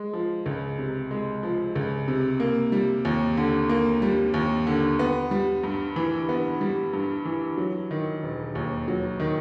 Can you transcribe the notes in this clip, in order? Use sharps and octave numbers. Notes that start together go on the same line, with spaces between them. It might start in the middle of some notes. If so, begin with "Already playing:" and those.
Already playing: G#3
F3
C#2
C3
G#3
F3
C#2
C3
A#3
G3
D#2
D3
A#3
G3
D#2
D3
B3
G3
G2
E3
B3
G3
G2
E3
F#3
D#3
E1
D#2
F#3
D#3